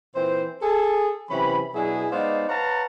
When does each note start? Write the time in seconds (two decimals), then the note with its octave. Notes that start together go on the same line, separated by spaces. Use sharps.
0.15 A#2 E3 C4 C5
0.62 G#4 A4
1.30 C3 E3 F#3 C#4 B5
1.74 B2 F#3 D4 E4 G#4
2.12 G#3 B3 D#4 C5 D5 F5
2.49 B4 C#5 F5 F#5 A5 A#5